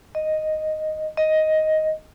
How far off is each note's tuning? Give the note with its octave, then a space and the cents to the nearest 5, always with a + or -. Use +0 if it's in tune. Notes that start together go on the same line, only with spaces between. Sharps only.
D#5 +0
D#5 +10